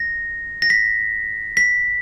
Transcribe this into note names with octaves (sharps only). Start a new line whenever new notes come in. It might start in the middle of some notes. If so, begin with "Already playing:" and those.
Already playing: A#6
A#6
B6
B6